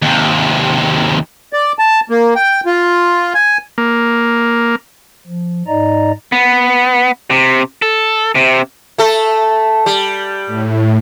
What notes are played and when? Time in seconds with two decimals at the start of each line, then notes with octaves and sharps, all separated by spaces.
0.02 D#2 C3
1.53 D5
1.79 A5
2.10 A#3
2.36 G5
2.66 F4
3.34 G#5
3.78 A#3
5.27 F3
5.67 G#2 D#4 D5 D#5 A#5
6.32 B3
7.30 C3
7.82 A4
8.35 C3
8.98 A3 A4
9.86 G3
10.47 A2